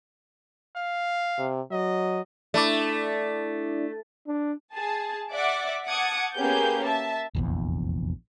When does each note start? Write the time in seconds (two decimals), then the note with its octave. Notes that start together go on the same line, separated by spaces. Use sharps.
0.76 F5
1.38 C3
1.71 F#3 D#5
2.54 A3 D4 E4 D5
4.27 D4
4.74 G#4 A5
5.32 D5 E5 F#5 D6
5.87 F#5 A5 D6 D#6 G#6 C#7
6.36 A#3 B3 C#4 G4 G#4 G6
6.85 E5 A5
7.35 F1 A#1 E2